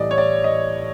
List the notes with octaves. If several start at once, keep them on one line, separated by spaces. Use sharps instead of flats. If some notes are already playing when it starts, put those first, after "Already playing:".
Already playing: A2 E3 G3 D5 D#5
C#5
D5
D#5